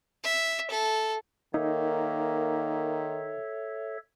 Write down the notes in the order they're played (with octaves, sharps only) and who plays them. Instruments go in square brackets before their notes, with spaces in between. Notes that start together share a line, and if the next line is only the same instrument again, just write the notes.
[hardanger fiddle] E5
A4
[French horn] D#3 [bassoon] A#3 [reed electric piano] D#4 [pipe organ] A4 C#5 E5